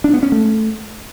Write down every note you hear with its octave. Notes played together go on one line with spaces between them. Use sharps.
D4
B3
C#4
A3